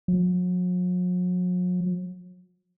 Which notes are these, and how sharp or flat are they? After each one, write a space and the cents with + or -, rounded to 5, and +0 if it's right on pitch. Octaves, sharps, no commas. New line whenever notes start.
F#3 -45